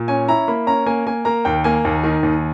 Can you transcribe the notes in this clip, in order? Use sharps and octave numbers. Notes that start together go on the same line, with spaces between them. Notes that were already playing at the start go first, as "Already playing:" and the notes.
Already playing: A#2
C#4 G#5
E4 A#5
A#3 B5
C#4 A#5
A#3 G#5
A#3 G#5
A#3 A#5
D#2 G5
A#3 G#5
D#2
D#3
D#2